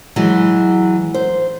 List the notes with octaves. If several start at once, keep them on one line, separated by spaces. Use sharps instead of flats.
E3 F#3 G#3
C5